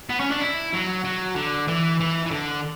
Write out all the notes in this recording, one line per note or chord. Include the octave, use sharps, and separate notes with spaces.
B3
C#4
D4
E4
F#3
F#3
D3
E3
E3
E3
D3